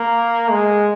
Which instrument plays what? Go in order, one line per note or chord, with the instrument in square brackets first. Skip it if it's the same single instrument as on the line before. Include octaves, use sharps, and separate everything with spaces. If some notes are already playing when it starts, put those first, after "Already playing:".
Already playing: [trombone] A#3
G#3